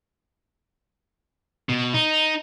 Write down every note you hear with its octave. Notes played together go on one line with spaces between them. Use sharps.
B2
D#4